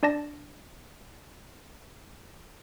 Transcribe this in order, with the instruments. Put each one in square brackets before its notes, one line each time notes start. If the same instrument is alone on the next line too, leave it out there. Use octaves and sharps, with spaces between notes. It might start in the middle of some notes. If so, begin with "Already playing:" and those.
[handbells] D4 D5 A5 A#6